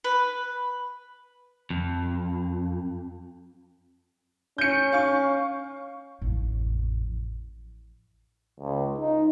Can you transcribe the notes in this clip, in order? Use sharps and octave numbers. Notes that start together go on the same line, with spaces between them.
B4
F2
C#4 G6 C#7
F5 C#6
A1 F2
C#2
D#4